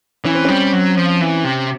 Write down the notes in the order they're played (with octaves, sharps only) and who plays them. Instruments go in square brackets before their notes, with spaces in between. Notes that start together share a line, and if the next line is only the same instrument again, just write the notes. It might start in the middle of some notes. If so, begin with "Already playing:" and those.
[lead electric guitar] E3 [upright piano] C#4
[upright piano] C4
[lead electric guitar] G3 [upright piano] C#4
[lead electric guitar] F#3
F3
E3
C3